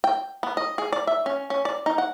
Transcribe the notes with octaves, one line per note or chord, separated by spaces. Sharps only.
G5
B3
D#5
G#4
D5
E5
C#4
C#4
D5
D#4
F#5